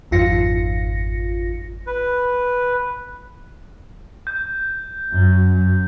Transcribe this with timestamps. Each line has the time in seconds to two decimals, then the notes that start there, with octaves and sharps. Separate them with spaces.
0.11 G#1 F2 F4 A#6 C#7
1.87 B4
4.27 G6
5.11 F#2 F#3